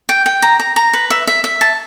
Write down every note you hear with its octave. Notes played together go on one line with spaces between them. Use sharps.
G5
G5
A#5
A#5
A#5
B4
E5
E5
E5
A5